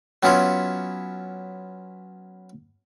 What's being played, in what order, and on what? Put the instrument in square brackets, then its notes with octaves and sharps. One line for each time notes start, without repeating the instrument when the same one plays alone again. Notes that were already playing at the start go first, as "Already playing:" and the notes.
[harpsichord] F#3 B3 C#4 E4 F4